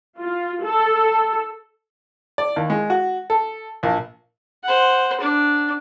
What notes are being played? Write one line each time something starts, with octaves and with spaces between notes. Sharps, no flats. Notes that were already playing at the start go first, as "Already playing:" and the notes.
F4
A4
D5
D#2
G#3
F#4
A4
A#1
C5 F#5
D4